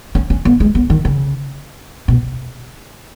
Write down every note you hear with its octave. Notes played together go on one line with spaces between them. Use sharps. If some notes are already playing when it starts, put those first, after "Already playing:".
C#4
C#4
B3
G#3
B3
D#3
C#3
B2